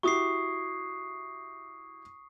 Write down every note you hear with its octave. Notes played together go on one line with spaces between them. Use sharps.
E4 F#4 G4 C#6 D#6 C7